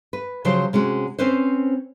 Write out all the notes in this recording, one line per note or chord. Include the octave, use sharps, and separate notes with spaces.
B4
C#3 F3 F#3 G4 C5
C3 G#3 C#4 F#4
C4 C#4 B4 C5